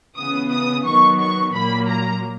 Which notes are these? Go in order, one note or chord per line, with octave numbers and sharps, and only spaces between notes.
C#3 E3 B3 D#6
D#6
D#3 F#3 B3 C#6
C#6
A#2 F#3 A#3 B5
A#5